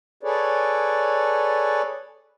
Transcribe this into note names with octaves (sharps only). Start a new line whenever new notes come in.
G#4 A4 B4 C#5 D5